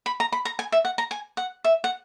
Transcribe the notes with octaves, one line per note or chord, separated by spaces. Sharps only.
B5
A#5
B5
A#5
G#5
E5
F#5
A#5
G#5
F#5
E5
F#5